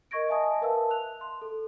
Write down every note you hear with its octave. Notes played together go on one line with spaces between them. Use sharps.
A#4 D#5 C#6 G#6 A#6 D7
D#5 E5 G#5 A5 D#6
A#4 B4 E5 F5 A5 E6
F#6 F7
C6
A4